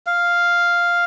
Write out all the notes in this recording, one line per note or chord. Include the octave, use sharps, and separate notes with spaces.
F5